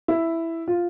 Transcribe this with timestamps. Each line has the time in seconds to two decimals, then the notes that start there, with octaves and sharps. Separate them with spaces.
0.08 E4
0.68 F4